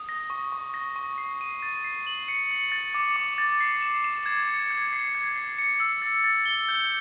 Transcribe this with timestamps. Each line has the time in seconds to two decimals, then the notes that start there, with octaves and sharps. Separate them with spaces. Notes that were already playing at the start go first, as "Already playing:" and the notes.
Already playing: D#6
0.09 A#6
0.30 C#6
0.52 C#6
0.74 A#6
0.96 C#6
1.18 C7
1.41 D#7
1.62 A6
1.84 C7
2.07 F#7
2.28 C#7
2.51 C#7
2.72 A6
2.94 D6
3.16 D6
3.38 A6
3.60 C7
3.82 E7
4.04 E7
4.26 G#6
4.48 C#7
4.71 G#6
4.93 C7
5.15 G#6
5.36 C7
5.58 C#7
5.80 E6
6.02 A6
6.24 A6
6.46 G7
6.69 G6